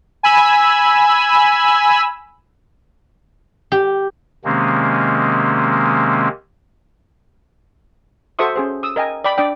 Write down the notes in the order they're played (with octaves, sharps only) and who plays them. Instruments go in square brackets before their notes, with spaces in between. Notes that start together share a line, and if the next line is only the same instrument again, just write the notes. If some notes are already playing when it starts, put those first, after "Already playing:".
[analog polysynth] G#5 B5 E6
[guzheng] G4
[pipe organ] C3 D#3 G#3 A#3 C4 C#4
[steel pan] F#4 A4 C5 E5 C#6 D#6
C#4 G#4 C5
D#6 E6
A#4 D#5 G5 G#5
D5 G5 B5
D4 D5 G5